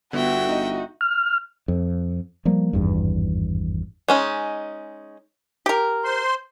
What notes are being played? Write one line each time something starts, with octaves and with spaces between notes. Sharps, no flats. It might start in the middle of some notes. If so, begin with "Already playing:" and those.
G1 D3 B3 F#4 E5 G5
D#4 D#5
F6
F2
F3 G3 A#3
G#1 E2 G2
G#3 C#4 D#4
G4 A#4
C5 C6